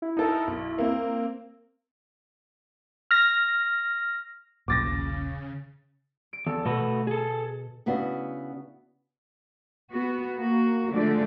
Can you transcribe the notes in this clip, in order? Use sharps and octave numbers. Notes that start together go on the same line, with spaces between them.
E4
D#4 A4 A#4
B1
A#3 C4
F6 A#6
E1 B1 A#2 C#3 D6 A6 A#6
D7
E2 A4
B2 A3 F#4 B4
G#4 A4
C#3 B3 D4 E4 F#4
B3 F#4
A#3 F#4
D3 F3 G#3 A3 D5